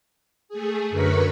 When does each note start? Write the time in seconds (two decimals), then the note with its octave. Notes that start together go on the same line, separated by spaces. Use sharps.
0.49 A3 G#4
0.90 F#2 D3 A#4 B4 B5 C#6